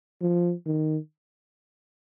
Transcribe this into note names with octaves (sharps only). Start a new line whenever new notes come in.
F3
D#3